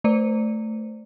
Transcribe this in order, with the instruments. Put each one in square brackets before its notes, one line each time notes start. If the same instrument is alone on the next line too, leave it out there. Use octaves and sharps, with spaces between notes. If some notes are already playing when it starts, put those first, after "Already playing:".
[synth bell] A3 C5 D5